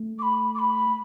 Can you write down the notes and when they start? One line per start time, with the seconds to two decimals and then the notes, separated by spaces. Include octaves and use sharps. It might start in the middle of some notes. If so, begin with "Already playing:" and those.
Already playing: A3
0.18 D6
0.22 B5
0.54 D6
0.58 B5